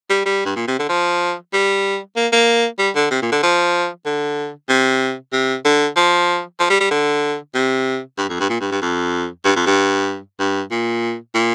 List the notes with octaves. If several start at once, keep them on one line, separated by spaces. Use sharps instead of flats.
G3
G3
G2
A#2
C3
D3
F3
G3
A#3
A#3
G3
D3
C3
A#2
D3
F3
D3
C3
C3
D3
F3
F3
G3
G3
D3
C3
G2
F2
G2
A#2
G2
G2
F2
G2
F2
G2
G2
A#2
A#2